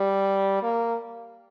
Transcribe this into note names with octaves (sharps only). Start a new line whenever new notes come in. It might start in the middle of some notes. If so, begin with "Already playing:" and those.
Already playing: G3
A#3